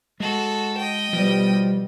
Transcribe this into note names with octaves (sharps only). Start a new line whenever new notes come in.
G#3 F#4 A4
D#5 G5
B2 F3 G3